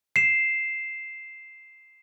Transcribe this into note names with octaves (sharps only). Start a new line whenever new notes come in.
C7 E7